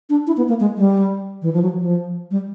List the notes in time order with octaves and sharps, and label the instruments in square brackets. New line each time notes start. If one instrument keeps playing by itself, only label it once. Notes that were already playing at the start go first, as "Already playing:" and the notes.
[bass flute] D4
E4
B3
A#3
G#3
G3
E3
F3
F#3
F3
G3